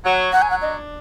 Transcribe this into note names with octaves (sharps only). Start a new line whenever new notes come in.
F#3 F#5
F#3 F#5
G#5
F#5
D4 D#5